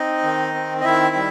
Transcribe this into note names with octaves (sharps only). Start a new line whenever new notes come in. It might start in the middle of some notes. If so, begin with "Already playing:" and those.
Already playing: C4 D#4 D#5
D#3
C4
D#5
D#3 E4 E5
G3